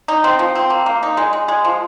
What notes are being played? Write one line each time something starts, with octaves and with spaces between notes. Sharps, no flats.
D#4
C4
F3
C4
A#3
A#3
D#4
G#3
G#3
G#3
F3